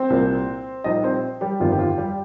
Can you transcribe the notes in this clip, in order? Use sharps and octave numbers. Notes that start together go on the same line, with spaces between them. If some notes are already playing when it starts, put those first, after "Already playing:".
Already playing: C4 C5
C2 A#2 G3 A#3
A#1 A#2 G3 D#4 D#5
C4 C5
G3 G4
G1 F2 D#3 C4 F4
G4
F4
G3 G4